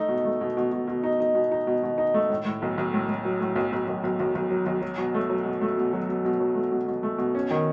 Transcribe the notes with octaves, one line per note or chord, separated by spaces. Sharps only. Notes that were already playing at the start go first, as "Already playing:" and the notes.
Already playing: A3 D#4
B2
A3
B2
B2
B2
B2
D#4
D#4
B2
D#4
B2
B2
D#4
A3
A2
A2
B1
B1
A2
A2
F#3
A2
B1
B1
B1
B1
B1
B1
F#3
B1
F#3
B2
A3
F#3
B2
A3
B2
F#3
B2
B2
F#3
A3
B2
B2
A3
B2
C#4
D#3